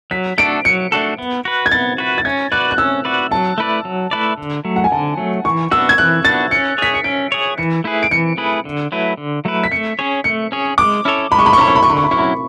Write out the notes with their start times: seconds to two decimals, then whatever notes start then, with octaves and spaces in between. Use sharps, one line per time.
0.11 F#3 B6
0.38 A3 D4 F#4 A4 D7
0.65 F#3 C#7
0.92 A3 D4 F#4 A4
1.18 B3
1.45 F#4 B4
1.66 G#6
1.71 B3 A6
1.98 F#4 B4
2.18 A6
2.25 C#4 G#6
2.52 F#4 B4 D5 F#6
2.71 F#6
2.78 C#4 E6
3.05 F#4 B4 D5
3.31 F#3 A5
3.58 A3 E4 B4 D5
3.85 F#3
4.11 A3 E4 B4 D5
4.38 D3
4.65 F#3 A3
4.76 F#5
4.84 G#5
4.92 D3 A5
5.18 F#3 A3
5.45 E3 C#6
5.71 B3 D4 F#4 E6
5.89 G#6
5.98 E3 F#6
6.24 B3 D4 F#4 A6
6.51 C#4 C#7
6.78 G#4 C#5 B6
6.94 C#7
7.04 C#4 D7
7.32 G#4 C#5
7.58 E3 C#7
7.84 A3 E4 G#4 B4
8.03 D7
8.11 E3 C#7
8.37 A3 E4 G#4 B4
8.65 D3
8.92 F#3 A3 E4 B4
9.17 D3
9.45 F#3 A3 E4 B4
9.64 B6
9.71 A3 C#7
9.99 C#4 G#4 C#5
10.24 A3 C#7
10.52 C#4 G#4 C#5
10.78 G#3 D6
11.05 C#4 E4 A4 C#5
11.31 G#3 B5
11.39 C#6
11.46 B5
11.53 C#6
11.58 C#4 E4 A4 C#5 B5
11.68 C#6
11.76 B5
11.83 D3 C#6
11.90 B5
11.97 C#6
12.04 B5
12.11 F#3 C#4 E4 C#6
12.19 B5